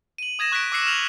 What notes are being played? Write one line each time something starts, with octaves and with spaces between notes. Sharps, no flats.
D#7 F#7
D#6 G#6 A#6 E7
C#6 F#6 A#6 B6 D7
D6 E6 F#6 C7 C#7 E7
F6 F7 F#7